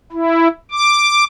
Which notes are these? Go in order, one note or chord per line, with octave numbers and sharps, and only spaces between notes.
E4
D6